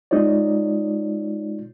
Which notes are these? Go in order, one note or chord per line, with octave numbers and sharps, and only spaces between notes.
G#3 D#4 F4 C#5 D5